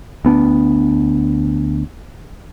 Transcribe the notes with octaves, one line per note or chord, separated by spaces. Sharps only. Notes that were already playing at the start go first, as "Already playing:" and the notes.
D2 B3 D4